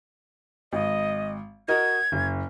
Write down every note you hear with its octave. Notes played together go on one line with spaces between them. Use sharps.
G#1 D#5
F#4 A#4 D#5 G#6
F#1